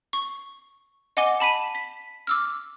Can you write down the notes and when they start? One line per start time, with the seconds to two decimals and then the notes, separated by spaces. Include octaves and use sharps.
0.13 C#6
1.17 D#5 F#5 G#5 D6 G7
1.40 A5 B5 B6 D#7
1.75 B6
2.27 D6 E6 F6